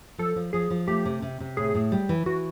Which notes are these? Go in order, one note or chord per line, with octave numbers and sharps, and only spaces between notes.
F3 A4
F3
F3 G#4
F3
A3 G4
C3
C3
C3
A2 G#4
A2
G3
E3
E3 F#4